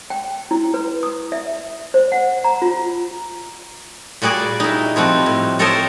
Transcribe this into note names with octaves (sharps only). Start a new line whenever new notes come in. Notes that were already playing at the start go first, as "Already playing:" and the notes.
G5
E4
B4
D#6
E5
C5
F#5
A#5
F4
A#2 G3 F#4 G#4 D5
D#4 E4
F3 G3 C4 F#4
A2
C4 A4 A#4 C5 C#5 D#5